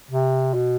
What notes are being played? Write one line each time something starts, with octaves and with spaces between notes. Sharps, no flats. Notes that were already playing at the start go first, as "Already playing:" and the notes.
C3
B2